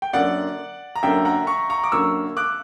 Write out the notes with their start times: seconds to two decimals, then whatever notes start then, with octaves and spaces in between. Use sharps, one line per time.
0.02 G5
0.13 F#2 D3 A#3 D5 F#5
0.95 A#5
1.02 F#2 D3 A#3 E5 G5
1.25 F#5 A#5
1.47 A#5 C#6
1.70 A#5 C#6
1.84 D6
1.92 F#2 D3 A#3 C#6 E6
2.37 D6 F#6